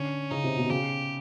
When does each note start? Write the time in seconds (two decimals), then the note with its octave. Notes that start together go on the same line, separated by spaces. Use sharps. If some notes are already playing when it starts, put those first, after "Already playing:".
Already playing: D3 C#4
0.31 C#3 D#4
0.44 C3
0.58 B2
0.70 C#3 G4